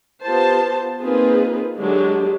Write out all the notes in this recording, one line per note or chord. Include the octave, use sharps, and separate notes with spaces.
B3 F4 G4 C5 A5
A#3 C4 D#4 F4 G#4 B4
D3 F#3 G#3 D4 G4